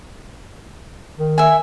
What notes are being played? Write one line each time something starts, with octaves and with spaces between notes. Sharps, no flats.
D#3
E5 G#5